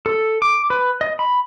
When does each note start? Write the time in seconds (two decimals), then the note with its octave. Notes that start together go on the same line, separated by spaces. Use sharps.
0.06 A4
0.42 D6
0.70 B4
1.01 D#5
1.19 B5